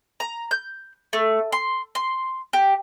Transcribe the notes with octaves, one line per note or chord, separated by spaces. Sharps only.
A#5
G6
A3
C6
C6
G4